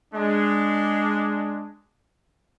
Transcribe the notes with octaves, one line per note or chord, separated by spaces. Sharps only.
G#3 D4